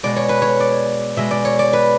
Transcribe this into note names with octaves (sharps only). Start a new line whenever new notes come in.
B2 G#3 D5
C#5
B4
C#5
D5
B2 G#3 E5
D5
C#5
D5
B4